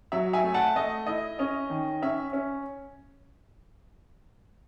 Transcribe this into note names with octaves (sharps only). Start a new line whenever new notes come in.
F#3 E5
E5 G#5
A3
F#5 A5
A3 D#5
E4 D#5
C#4 D#5
D#3
C#4 E5
C#4